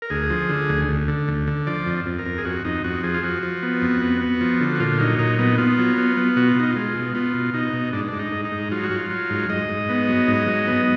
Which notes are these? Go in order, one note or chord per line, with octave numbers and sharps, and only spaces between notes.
A#4
D2 G#4
F3
D3
D2
D2
D3
D2
D3
F3 D5
F2
F2
A#4
F2
G#4
F2 F#4
F2 D#4
F2 F#4
F3 G#4
F4
F3 F#4
F3
B3
F2
B3
B3
F3
D3
F#4
A#2 F4
F#3 D#4
A#2 D#4
B3 D#4
B3 F4
F#3
B3
B3
B2 F#4
F4
B2 D#4
F4
G#3
B2
B3 F4
B2
B2 D#4
B2
G#2 D4
G#2 D4
D#4
G#2
D#4
G#2
F#3 F4
F#4
F#3
F4
F#3
G#2
G#2 D#5
G#2
B3
F#3
G#2
F#3
B3